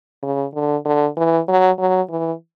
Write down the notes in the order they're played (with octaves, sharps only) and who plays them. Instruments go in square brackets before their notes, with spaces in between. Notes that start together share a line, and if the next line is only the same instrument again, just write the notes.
[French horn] C#3
D3
D3
E3
F#3
F#3
E3